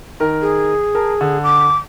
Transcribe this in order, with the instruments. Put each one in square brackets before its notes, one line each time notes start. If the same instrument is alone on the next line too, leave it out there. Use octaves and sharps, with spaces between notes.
[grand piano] D#3 A#4
[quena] G#4
[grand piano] A#4 A5
D3
[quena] D6